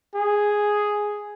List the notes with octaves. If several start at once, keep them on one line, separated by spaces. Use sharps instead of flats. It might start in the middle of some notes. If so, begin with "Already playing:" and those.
G#4